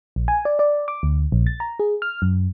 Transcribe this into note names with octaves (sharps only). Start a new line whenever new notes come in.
A#1
G#5
D5
D5
D6
D2
A#1
A6
A#5
G#4
F6
F#2